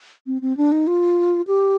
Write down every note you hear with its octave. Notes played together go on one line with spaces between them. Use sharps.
C4
C4
D4
D#4
F4
G4